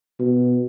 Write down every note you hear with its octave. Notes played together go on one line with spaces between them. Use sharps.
B2